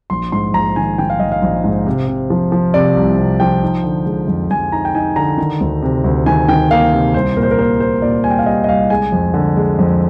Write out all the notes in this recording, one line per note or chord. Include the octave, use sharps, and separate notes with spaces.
A#1 C6
G#2 C6
A#1 A#5
D#3 G#5
D#3 G5
F5
A#1 D#5
F5
A#1
G#2
C3
C3
F3
F3
C3 D5
C2
C3
F3 G5
D#4
D3
G#3
F2
F2 G#5
D#4 A#5
G5
D#4 G#5
D3 A#5
D#3
D2
C3
D2
D#3 G#5
D#3 G5
A#3 F5
C3
C2 C5
A#2 A#4
C5
A#4
A#3 C5
A#2 C5
A#2 D5
G3 G#5
G5
F5
G3 D#5
D#5
C2 F5
G#3 G#5
F2
D3
G#3
F2